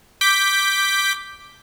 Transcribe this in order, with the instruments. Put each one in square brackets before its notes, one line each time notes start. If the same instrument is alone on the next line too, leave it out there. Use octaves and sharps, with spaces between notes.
[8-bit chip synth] D6 G6 B6